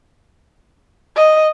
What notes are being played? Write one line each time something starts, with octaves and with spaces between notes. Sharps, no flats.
D#5